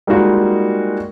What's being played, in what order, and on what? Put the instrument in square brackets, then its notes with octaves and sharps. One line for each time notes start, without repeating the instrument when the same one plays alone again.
[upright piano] G3 G#3 A#3 D#4 F4 F#4